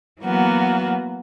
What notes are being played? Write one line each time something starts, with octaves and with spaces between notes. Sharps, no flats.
E3 F#3 A#3 B3 F#4